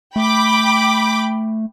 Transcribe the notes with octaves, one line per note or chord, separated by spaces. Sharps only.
A3 G5 B5 D6